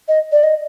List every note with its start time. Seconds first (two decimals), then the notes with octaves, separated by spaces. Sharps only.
0.08 D#5
0.32 D5
0.43 D#5